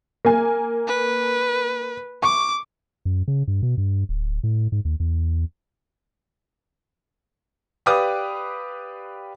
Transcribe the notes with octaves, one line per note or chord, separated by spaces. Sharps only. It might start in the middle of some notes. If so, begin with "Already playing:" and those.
A#3 A#4 G#5
B4
C#6 D6
F#2
C#3
G2
B2
G2
D1
A2
G#2
D#2
E2
G4 B4 D5 F5 D6 D#6